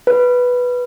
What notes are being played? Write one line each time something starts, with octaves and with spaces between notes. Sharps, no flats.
B4